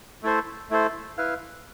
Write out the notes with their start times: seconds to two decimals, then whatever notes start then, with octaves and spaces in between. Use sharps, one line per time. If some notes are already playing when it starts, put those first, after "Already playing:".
0.23 A3 E4 A4 C5
0.70 A3 E4 A4 C5
1.18 E4 B4 F5